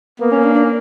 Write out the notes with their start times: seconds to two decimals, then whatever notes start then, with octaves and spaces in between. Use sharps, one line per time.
0.20 A#3 B3
0.31 C#4
0.43 D4
0.55 D4